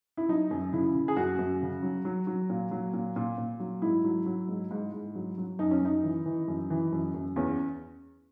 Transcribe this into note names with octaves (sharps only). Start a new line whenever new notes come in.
E4
F#3 D#4
F#2
C#3 E4
C#3
G#4
F#2 F#4
F#2
C#3
F#3
F#3
F#3
A#2
F#3
A#2
A#2
A#2
F#3
G#2 E4
F#3
F#3
G#2
G#2
G#2
F#3
F#3
F#2 D#4
C#4
F#2 D#4
E3
E3
F#2
E3
F#2
F#2
E2 C#4